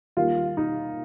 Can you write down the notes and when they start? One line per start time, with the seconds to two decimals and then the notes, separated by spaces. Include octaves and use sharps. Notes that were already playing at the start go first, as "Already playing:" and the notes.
0.17 D#2 D#3 G3 F4
0.57 D#4